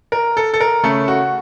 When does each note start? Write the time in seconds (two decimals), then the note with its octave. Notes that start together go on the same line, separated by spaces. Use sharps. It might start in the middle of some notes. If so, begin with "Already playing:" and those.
0.12 A#4
0.37 A4
0.54 A4
0.60 A#4
0.83 C#3 A3 A4
1.08 F#4